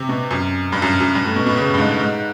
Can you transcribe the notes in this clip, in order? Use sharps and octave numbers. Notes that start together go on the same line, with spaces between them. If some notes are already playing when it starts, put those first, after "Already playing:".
Already playing: C3
B2
F#2
G2
F#2
F#2
G2
A2
B2
B2
C#3
G2
G#2
G#2